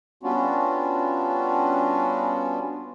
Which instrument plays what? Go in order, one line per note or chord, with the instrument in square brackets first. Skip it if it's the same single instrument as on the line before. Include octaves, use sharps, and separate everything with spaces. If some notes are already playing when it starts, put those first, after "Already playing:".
[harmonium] G3 B3 C#4 D4 F4 F#4